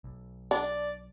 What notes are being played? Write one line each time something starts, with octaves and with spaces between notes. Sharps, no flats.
B1
D4 D5